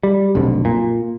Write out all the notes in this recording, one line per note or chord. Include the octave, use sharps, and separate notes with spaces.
G3
F1 B1 F2 D3
A#2